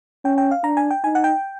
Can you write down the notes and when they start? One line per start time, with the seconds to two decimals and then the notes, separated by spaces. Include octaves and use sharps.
0.24 C#4 G5
0.38 G5
0.51 F5
0.63 D4 A#5
0.77 G#5
0.91 G5
1.04 D#4 G#5
1.15 F#5
1.24 G5